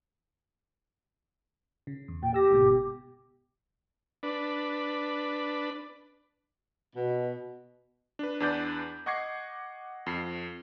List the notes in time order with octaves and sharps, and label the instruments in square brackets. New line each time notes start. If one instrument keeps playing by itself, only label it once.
[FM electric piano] C#3
E2
[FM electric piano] A#2 [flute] G5
[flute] G4 [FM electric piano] E6 A#6
[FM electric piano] G1 G#2 B2
[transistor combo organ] D4 B4
[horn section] B2
[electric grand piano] D4 B4
E2 D4 B4 D5 G6
D#5 F#5 C#6 D6 G#6 C7
F2 C7